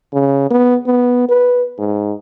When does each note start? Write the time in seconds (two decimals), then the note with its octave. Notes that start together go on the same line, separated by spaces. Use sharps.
0.13 C#3
0.50 B3
0.86 B3
1.29 B4
1.78 G#2